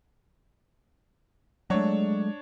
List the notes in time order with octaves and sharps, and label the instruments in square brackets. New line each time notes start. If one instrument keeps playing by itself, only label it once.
[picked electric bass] F#3 A3 [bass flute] G#3 [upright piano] D4 C#5